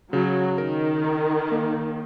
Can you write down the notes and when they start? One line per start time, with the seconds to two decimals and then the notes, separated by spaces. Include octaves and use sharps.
0.13 C#3 F#3
0.58 D#3 A#4
1.04 D#4
1.51 A#3